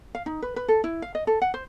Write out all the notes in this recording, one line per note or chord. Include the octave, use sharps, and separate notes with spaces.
F5
D#4
B4
B4
A4
E4
F5
D#5
A4
F#5
C5